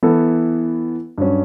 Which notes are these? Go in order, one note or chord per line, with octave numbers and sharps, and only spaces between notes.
E3 B3 E4 A4
G2 F#3 C#4